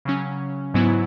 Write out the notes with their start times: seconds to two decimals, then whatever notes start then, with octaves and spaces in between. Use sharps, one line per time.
0.05 C#3 F#3 C#4
0.74 G#2 F#3 B3 E4